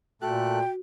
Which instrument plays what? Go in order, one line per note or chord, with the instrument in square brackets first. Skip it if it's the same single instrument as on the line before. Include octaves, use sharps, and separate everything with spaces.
[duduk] A#2 [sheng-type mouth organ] A3 A4 F#6 [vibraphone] F#4 [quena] G5